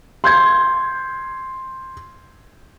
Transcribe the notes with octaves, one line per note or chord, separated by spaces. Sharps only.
C6 G6 G#6